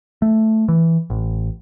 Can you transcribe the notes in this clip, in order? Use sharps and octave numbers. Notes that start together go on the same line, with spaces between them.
A3
E3
A1